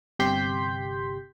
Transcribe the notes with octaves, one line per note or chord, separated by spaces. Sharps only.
G1 C3 G4 C6 G6 B6